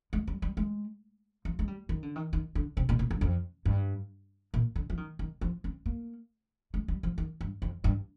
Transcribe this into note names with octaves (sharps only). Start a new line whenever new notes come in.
G#3
G3
G3
G#3
F3
G#3
G3
D#3
D3
D#3
D#3
D3
C3
A#2
A#2
G2
F2
G2
A#2
D3
F3
D#3
D#3
F3
C4
A#3
G#3
G3
F3
D#3
G2
F2
G2